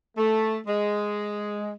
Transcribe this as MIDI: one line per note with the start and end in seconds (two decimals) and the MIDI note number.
0.17 0.58 57
0.67 1.70 56